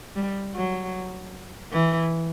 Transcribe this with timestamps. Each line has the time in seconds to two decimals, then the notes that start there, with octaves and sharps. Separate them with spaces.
0.15 G3
0.54 F#3
1.73 E3